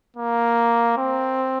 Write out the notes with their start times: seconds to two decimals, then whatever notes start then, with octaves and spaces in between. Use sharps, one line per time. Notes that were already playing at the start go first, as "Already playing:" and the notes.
0.16 A#3
0.97 C4